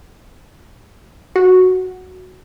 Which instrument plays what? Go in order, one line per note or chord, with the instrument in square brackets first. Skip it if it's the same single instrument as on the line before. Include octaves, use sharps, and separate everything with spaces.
[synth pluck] F#4